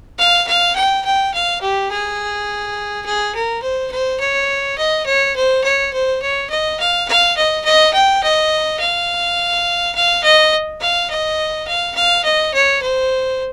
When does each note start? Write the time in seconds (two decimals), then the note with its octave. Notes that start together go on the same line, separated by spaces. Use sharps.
0.19 F5
0.47 F5
0.76 G5
1.05 G5
1.33 F5
1.62 G4
1.91 G#4
3.06 G#4
3.35 A#4
3.62 C5
3.91 C5
4.20 C#5
4.78 D#5
5.06 C#5
5.36 C5
5.64 C#5
5.93 C5
6.22 C#5
6.50 D#5
6.80 F5
7.08 F5
7.37 D#5
7.65 D#5
7.93 G5
8.23 D#5
8.80 F5
9.95 F5
10.24 D#5
10.81 F5
11.10 D#5
11.67 F5
11.95 F5
12.24 D#5
12.54 C#5
12.82 C5